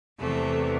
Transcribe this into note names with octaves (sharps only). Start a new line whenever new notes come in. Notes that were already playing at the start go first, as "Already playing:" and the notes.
E2 C3 E3 A3